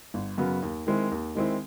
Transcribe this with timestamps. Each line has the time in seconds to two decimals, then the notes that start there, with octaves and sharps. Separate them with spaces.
0.14 G1
0.38 F#2 C#3 F#3 B3
0.62 D#2
0.87 D#3 G#3 C4 E4
1.11 D#2
1.35 D#3 G#3 C4 E4